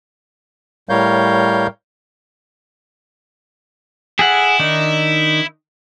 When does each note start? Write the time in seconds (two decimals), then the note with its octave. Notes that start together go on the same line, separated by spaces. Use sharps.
0.89 A2 G3 A#4 C#5 F5 G6
4.19 E4 G#4 A4 F#5
4.59 D#3 D4 D#4